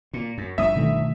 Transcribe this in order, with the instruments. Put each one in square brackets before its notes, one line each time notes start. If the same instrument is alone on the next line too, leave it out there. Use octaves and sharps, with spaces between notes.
[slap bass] A#2
F#2
[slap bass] G1 G2 F3 [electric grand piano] E5 D#6
[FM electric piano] B2 D#3 A3